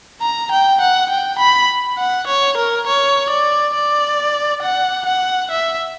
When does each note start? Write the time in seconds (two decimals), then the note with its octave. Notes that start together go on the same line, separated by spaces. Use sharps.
0.22 A#5
0.51 G5
0.81 F#5
1.10 G5
1.39 B5
1.98 F#5
2.27 C#5
2.57 A#4
2.87 C#5
3.30 D5
3.74 D5
4.62 F#5
5.06 F#5
5.51 E5